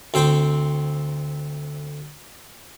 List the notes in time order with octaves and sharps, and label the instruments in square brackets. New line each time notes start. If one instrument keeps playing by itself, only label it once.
[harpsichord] D2 C4 C5 G5